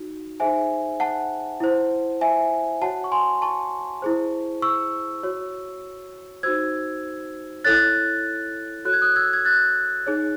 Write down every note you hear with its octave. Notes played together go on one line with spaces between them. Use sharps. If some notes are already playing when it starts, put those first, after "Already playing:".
Already playing: D#4 F#4
D#4 G#4 C5 E5 G#5
F#5 A5
E4 C5
E5 G#5
F#4 C#5 F#5 A5
C#6
G#5 C6
A5 C#6
E4 G#4 C5
C#6 E6
F#4 C#5
D#4 F#4 C5 E6 G#6
E4 A4 C#5 F#6 A6
F#4 A4 C#5 F#6
G#6
D#6 F#6
E6 G#6
G#6
F#6 A6
D#4 G#4 C#5